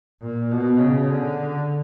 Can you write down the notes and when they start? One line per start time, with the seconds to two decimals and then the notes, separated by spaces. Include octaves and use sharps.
0.22 A#2
0.51 B2
0.80 C#3
1.09 D3